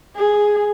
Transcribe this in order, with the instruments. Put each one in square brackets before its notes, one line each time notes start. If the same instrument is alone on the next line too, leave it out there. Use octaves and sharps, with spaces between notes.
[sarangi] G#4